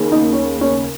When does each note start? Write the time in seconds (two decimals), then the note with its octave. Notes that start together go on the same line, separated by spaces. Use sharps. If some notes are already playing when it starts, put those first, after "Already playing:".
Already playing: D#2 C#3
0.12 D#4
0.33 C#4
0.61 C#4